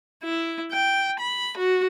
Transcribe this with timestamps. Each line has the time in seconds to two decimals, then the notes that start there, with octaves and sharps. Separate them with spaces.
0.23 E4
0.72 G5
1.19 B5
1.57 F#4